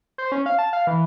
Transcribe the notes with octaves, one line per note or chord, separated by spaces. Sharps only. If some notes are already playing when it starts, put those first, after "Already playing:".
C5
C#4
F5
A5
F5
E3